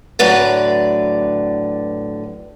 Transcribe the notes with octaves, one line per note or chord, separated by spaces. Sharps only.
A2 D3 F#3 B4 D5